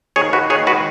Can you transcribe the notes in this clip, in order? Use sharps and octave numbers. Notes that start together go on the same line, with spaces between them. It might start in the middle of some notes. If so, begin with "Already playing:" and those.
D#2 G#4 C#5
D#2 F#4 B4
D#3 G#4 C#5
G#3 F#4 B4